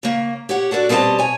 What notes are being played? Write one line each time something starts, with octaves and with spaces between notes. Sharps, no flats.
C#3 A#3
G4 C#5 F#5
D4 F#4 A4 B4 D5
B2 G3 C4 C5 D#5 A5
C#5 G#5